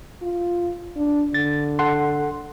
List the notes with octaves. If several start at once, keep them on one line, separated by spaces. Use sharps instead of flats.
F4
D4
D3 A6
A4 F#5 C6